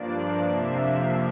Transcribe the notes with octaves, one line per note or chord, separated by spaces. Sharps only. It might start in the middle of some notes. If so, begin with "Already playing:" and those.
Already playing: G2 F3 A#3 D4 D5
F2 C3 F3 A#3 D4 E5